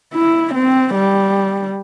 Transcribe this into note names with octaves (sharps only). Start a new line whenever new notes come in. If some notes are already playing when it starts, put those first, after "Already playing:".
E4
C4
G3